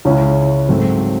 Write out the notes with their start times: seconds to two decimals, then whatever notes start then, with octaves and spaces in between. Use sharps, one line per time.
0.05 C#2 C#3 G#3 C#4 E4
0.69 G#2 F#3 A3 C4